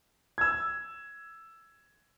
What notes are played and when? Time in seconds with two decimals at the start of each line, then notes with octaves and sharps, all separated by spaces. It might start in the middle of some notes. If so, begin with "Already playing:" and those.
0.38 E6 G#6